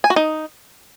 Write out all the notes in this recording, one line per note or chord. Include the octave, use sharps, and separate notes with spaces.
G#5
F#4
D#4